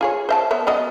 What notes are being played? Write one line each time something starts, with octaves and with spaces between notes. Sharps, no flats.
F4 G#4 C#5
C5 E5 A5
B3 C#5 E5
F#3 B3 D#5